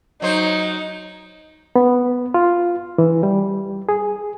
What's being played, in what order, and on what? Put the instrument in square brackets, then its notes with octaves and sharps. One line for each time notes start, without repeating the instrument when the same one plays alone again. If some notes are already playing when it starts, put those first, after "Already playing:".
[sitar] F#3 C5 [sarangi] D#4
[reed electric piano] B3
F4
E3
G3
G#4